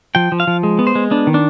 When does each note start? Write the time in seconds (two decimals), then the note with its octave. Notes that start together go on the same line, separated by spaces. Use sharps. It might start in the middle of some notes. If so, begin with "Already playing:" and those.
0.15 F3 G5
0.32 F3
0.40 F5
0.47 F3
0.63 G#3
0.79 B3
0.87 C5
0.95 G#3
1.11 B3 D4
1.27 D#3
1.34 D4